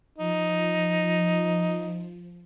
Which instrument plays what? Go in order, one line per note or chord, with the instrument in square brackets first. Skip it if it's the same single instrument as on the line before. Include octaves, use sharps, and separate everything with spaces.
[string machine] F3 [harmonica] D#4